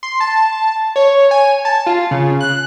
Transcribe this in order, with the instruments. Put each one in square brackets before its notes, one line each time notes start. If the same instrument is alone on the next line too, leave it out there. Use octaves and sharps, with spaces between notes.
[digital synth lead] C6
A5
C#5
G#5
A5
F4
C#3
F#6